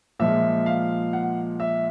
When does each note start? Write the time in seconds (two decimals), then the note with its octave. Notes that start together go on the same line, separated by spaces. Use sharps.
0.19 A#2 F3 G#3 E5
0.66 F5
1.13 F#5
1.60 E5